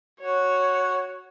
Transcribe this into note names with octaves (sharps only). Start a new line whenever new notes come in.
F#4 C#5